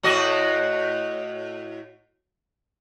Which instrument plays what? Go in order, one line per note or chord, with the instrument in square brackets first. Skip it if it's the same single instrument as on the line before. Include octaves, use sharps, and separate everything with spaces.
[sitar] A2 F#4 D#5